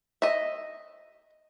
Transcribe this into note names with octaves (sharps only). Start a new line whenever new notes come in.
D#5 E5